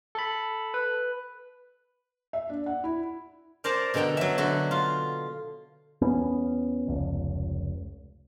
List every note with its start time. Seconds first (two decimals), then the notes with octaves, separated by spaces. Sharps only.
0.15 A4 B5
0.74 B4
2.33 E5
2.49 D4
2.66 F#5
2.84 E4
3.64 A#4 C5 D5 A5 A#5
3.94 B2 D3 A4 G5 A#5
4.17 F#3 E5
4.38 D3 F#4
4.71 F4
6.01 E2 B3 C#4
6.88 F1 C#2